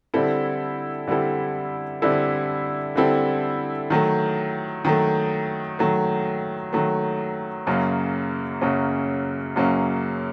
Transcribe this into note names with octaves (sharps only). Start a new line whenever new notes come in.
D3 G3 C4 E4 A4
D3 G3 C4 E4 A4
D3 G3 C4 E4 A4
D3 G3 C4 E4 A4
D#3 F#3 A3
D#3 F#3 A3
D#3 F#3 A3
D#3 F#3 A3
F#2 C#3 F#3 A#3 C#4
F#2 C#3 F#3 A#3 C#4
F#2 C#3 F#3 A#3 C#4